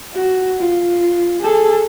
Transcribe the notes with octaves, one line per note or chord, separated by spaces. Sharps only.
F#4
F4
G#4 A4